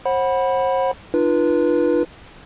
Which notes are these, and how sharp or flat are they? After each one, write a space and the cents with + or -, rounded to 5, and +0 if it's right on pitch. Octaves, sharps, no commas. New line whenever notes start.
C5 +35 F#5 +0 B5 -10
D4 +45 F4 -20 B4 -25